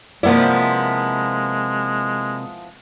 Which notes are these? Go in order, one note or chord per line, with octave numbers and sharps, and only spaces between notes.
C3 F3 G#3 A#3 B3 E4 D5